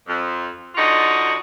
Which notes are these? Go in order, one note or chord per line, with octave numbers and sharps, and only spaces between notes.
F2
D3 D#4 F4 F#4